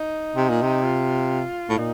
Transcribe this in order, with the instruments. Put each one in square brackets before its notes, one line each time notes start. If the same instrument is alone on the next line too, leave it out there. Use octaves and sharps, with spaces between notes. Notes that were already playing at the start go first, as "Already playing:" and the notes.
Already playing: [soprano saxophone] D#4
[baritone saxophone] C3
A#2
C3
[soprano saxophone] F4
[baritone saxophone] A2
[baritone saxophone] A#2 [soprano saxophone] D#4